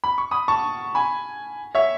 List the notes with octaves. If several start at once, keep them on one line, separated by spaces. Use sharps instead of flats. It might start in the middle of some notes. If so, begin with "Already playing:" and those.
B5
C#6
B5 D#6
A5 C#6
G#5 B5
C#5 E5